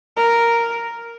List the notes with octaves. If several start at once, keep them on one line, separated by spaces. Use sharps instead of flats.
A#4